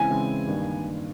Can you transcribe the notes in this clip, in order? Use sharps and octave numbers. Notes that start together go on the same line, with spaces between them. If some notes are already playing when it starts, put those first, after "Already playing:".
Already playing: C#3 E3 G#3 C4 E4 G#5
C#3 E3 G#3 C4 E4
G2 D#3 G3 A#3